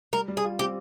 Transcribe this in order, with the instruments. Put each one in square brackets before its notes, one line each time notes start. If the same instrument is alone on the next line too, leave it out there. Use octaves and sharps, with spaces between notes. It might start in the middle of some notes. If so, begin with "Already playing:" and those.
[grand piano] G3 [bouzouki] A#4
[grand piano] G3
[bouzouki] G#4
[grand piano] F4
[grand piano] C4 [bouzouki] G4